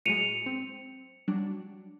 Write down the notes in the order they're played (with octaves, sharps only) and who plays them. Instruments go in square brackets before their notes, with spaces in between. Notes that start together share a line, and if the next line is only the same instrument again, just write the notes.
[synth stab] A2 F#3 G#3 [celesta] C#7 D#7 F7
[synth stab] C4
F#3 G3 D4